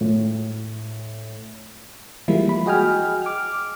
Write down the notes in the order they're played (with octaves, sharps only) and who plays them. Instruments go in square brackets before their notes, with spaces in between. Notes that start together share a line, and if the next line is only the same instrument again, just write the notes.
[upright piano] A2
[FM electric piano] E3 F3 G3 G#3 A#3 E4
B5
F#4 G#4 D#5 G5 G#5 F6
D6 F6